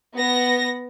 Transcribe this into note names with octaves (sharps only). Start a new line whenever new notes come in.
B3 A#6